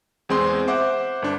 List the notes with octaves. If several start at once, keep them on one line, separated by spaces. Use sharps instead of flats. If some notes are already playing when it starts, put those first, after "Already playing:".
E2 G#3 C4 G#4 C6
C5 E5 F#5 D6
G1 D4